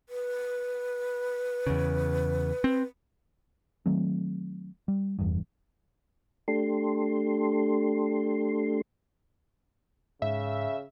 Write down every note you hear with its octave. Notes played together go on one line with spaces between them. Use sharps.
B4
E2 C#3
C4
D#3 F#3 A3 C4
G3
F1 E2 G2
A3 D4 G4 A4 C6
G#2 C#3 E5